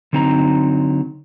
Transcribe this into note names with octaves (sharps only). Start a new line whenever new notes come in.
D3 F#3 C4 D#4 A#5